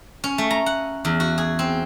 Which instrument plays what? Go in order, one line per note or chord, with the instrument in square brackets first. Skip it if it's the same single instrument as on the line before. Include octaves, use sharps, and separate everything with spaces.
[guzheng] C#4
A3
A#5
F#5
E2
F#4
G#4
C4